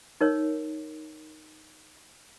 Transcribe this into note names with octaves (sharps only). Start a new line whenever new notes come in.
D#4 A#4 C#5